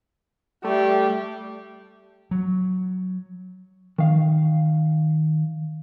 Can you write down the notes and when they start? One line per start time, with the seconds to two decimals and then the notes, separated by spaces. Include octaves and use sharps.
0.64 G3 A3
2.31 F#3
3.98 D#3 F5